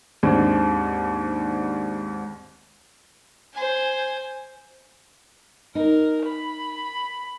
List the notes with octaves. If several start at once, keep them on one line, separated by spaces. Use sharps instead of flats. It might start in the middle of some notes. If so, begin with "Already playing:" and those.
D#2 G#2 C4 D4
C5 G#5
D#4 A#4
B5